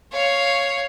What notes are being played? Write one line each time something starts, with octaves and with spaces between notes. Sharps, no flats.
C#5 F5